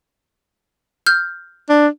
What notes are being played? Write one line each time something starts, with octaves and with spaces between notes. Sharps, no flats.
F6 G6
D4